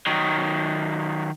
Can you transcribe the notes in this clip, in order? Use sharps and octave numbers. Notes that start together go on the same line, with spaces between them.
D#3 F#3